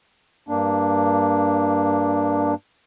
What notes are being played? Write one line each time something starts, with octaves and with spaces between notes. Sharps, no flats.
G2 A#3 D4